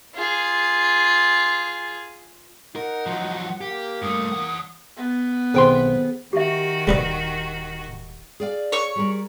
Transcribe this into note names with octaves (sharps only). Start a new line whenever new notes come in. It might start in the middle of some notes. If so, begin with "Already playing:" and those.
F4 G#4
D#4 A#4 F#5
F3 F#3
A#3 G4
G2 A3 D#6
E3 F#5
B3
B1 D#3 C4 G#4 A4 C5 G5 C6
D#3 F#4 G4 E5
D#1 G3 B4 D#5
G#4 D5 F5
C#5 C#6
G3 G#4 A#4